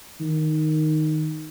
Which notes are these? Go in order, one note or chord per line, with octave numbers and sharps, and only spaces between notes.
D#3